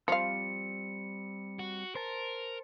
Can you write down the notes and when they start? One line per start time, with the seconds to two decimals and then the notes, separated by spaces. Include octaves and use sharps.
0.08 F3 G3 C4 F5 C#7
1.59 F#4
1.95 A#4 C5 A5